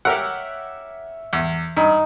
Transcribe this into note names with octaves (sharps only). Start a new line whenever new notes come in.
G4 A#4 C#5 E5 F#5
E2
G2 D#4